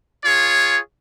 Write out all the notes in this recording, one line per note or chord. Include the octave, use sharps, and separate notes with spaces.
F4 G#4 C#5